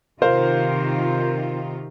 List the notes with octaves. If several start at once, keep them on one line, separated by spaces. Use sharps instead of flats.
C3 D#3 F4 A#4 C5 F5